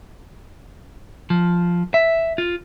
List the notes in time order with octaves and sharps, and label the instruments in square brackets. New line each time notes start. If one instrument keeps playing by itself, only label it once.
[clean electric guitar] F3
E5
F4